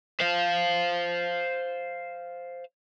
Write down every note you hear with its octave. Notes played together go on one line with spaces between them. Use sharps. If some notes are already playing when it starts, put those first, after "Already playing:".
C5 F5